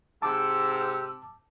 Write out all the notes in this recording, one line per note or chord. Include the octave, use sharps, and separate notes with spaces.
G#2 C3 A5 D6 E6